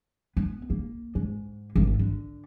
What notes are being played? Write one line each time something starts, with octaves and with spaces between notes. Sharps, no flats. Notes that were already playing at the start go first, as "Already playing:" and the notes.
B3
A#3
G#2
G#1
D3